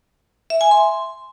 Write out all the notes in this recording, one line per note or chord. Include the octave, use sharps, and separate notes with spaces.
E5
G#5
C6